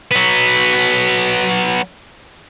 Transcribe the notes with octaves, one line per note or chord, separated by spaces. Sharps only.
F#3 B3